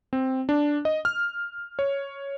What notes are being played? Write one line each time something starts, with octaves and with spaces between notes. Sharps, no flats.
C4
D4
D#5
F6
C#5